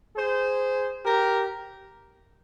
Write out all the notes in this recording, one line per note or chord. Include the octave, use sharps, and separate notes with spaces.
G#4 C5
G4 A#4